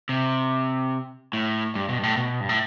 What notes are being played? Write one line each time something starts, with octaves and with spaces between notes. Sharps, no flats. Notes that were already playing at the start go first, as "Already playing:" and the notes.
C3
A2
G2
B2
G2
A2
B2
G2
A2